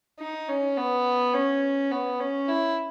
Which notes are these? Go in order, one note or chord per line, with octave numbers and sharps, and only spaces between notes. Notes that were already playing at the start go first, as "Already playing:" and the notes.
D#4
C#4
B3
C#4
B3
C#4
E4